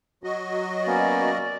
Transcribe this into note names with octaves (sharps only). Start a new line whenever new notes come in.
F#3 F#4 D#5
A#3 B3 C#4 D5